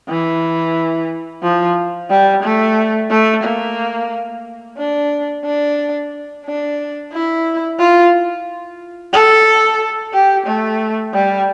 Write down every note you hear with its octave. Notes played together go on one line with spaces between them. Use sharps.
E3
F3
G3
A3
A3
A#3
D4
D4
D4
E4
F4
A4
G4
A3
G3